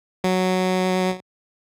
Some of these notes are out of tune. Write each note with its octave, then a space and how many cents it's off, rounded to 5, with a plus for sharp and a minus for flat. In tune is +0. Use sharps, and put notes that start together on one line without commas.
F#3 +0